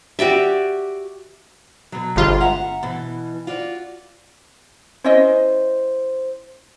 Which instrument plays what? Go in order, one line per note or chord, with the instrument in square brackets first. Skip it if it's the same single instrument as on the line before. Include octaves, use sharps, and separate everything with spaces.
[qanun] F#4 G4 D5 E5
[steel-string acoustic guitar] B2 F#3
[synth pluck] G1 F4 [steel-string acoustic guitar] G#3
[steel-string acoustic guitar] E5 F#5 A#5
B2 E3
F4 F#4 D5
[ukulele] C#4 E4 D#5 [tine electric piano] C5